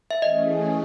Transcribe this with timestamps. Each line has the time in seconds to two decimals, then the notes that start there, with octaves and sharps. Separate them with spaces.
0.11 E5
0.22 E3 A3 C#4 G#4 D#5